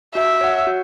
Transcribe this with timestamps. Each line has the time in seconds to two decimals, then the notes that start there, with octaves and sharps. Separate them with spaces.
0.15 F#4 E5
0.41 C#5 F#5
0.67 F#4